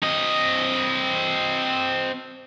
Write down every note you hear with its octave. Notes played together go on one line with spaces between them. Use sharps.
C4 D#5